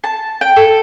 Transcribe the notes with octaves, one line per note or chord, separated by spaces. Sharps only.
A5
G5
A4